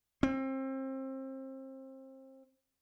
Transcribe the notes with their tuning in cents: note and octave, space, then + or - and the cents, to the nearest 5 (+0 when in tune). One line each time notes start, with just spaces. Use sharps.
C4 +30